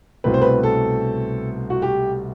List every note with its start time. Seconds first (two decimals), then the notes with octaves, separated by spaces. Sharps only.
0.24 C2 B2 A3 C4 B4
0.34 C5
0.42 B4
0.63 A4
1.70 F#4
1.82 G4